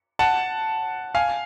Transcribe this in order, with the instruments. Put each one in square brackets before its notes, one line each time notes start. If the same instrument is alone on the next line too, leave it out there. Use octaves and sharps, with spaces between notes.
[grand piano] F#5 A5
F5 G#5